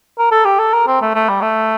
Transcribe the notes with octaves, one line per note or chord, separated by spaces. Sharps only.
A#4
A4
G4
A4
A#4
C4
A3
A3
G3
A3